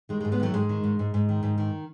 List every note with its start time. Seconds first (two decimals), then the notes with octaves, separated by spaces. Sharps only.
0.09 D#3 G#3
0.20 G#3
0.25 G#2
0.32 G#3 B3
0.40 D#3 F#3 A3
0.54 G#2 G#3
0.69 D#3
0.84 G#2
0.99 G#2
1.14 G#2
1.29 D#3
1.43 G#2
1.58 D#3